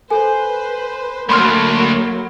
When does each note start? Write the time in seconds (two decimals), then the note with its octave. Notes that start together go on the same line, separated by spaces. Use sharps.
0.10 A4 B4 C5 G#5
1.29 D2 F#3 A3 A#3 B5 C6 F6